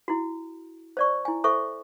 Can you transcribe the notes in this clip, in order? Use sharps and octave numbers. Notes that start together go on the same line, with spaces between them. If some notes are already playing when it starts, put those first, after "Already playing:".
E4 F#4
C5 D5 C#6
E4 G#5
A4 C5 E5 C#6